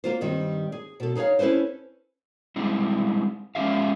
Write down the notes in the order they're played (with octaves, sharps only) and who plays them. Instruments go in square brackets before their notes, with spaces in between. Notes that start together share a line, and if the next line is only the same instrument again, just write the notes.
[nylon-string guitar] A#3 F4 C5
G2 D#3 G3 C4
G#4
B2 A4
D#4 G#4 C5 C#5 F5
C#4 E4 A4 B4 C5
[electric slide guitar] G3 G#3 C4 D#4 E4
G#3 C#4 F4 G4 E5 F5